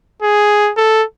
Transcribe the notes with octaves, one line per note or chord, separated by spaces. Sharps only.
G#4
A4